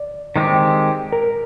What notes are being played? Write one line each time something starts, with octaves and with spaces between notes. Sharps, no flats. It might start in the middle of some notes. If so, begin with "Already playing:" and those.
Already playing: D5
D#3 G#3 C4 G4
A#4